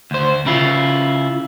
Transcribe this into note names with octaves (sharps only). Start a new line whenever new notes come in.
D2 C5
C#3 E4 F4